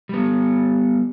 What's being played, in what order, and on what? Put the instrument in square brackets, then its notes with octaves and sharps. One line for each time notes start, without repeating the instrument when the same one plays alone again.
[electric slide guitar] G3 B3